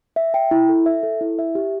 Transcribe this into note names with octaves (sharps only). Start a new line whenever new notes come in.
E5
G5
E4
A4
E5
A4
E4
E5
G4